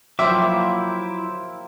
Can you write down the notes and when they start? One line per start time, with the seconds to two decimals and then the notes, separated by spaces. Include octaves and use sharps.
0.19 F3 F#3 E4 A#4 C5 E5 G5 D6
0.41 A#3